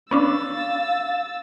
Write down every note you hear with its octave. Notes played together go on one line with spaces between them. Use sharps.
B3 C#4 D4 F5 E6 A6